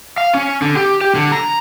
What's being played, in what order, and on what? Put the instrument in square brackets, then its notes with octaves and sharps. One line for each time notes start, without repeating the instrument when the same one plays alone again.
[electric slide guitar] F5
C#4
D3
G4
G4
D3
A#5